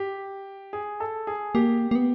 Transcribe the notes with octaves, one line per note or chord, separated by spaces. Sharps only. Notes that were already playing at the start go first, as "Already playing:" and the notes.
Already playing: G4
G#4
A4
G#4
A#3 G4
A#3
B3